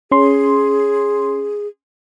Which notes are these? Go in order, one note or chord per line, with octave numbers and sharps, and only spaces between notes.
C#4 G#4 C6